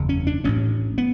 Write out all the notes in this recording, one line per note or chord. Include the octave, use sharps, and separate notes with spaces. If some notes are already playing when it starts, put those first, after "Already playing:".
Already playing: F#1 E2 C#3
C#4
D4
A1 A2 C#4
B3